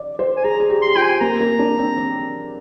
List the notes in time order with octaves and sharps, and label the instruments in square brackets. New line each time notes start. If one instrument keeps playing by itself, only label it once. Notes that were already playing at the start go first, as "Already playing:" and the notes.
Already playing: [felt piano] D5
C5
[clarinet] G#5
[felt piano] G#4 [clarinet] A#5
[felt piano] G#4
G4
[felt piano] G4 [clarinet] C6
[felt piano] F4 [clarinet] G5
[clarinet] G#5
[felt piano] A#3 [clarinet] A#5
[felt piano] A#3
D4
C4
C4